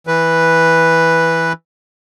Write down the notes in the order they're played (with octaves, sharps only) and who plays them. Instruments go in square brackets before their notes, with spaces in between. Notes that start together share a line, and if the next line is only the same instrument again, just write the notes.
[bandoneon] E3 B4